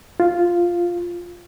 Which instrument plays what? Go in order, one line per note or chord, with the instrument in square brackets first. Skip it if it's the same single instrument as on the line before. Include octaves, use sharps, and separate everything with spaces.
[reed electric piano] F4